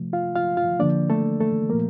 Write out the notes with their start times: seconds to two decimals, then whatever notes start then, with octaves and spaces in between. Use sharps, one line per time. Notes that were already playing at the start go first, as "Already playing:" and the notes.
Already playing: C3 F3 A3
0.13 F4 F5
0.36 F4 F5
0.57 F4 F5
0.80 D3 F3 A#3 D4 D5
1.10 A3 A4
1.40 A3 A4
1.69 A#2 F3 A3 A#3 A#4